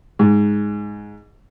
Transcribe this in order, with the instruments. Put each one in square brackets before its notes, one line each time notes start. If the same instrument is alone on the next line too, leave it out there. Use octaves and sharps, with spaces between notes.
[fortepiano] G#2